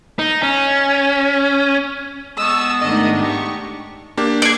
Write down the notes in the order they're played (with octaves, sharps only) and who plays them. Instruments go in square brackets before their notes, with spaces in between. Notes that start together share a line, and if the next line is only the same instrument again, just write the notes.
[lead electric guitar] D#4
C#4
[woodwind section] G#3 B3 [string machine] A5 [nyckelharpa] C#6 D#6 [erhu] E6
[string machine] G#2 D#3 A3 [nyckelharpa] D4 D#4 [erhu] D#5
[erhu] G4 [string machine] C#6
[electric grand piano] A#3 D4 G4
[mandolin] G#4 D5